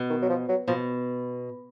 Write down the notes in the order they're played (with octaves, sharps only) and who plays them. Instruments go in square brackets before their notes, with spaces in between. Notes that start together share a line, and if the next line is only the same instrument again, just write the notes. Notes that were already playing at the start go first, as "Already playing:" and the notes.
Already playing: [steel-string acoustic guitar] B2
[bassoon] D#3
F#3
F3
F#3
[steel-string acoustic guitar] B2 [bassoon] F3